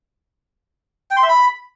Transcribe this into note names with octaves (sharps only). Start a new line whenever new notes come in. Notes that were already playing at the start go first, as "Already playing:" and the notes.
G5
C6
E5
B5